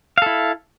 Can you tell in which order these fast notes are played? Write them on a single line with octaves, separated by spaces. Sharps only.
F5 A4 E4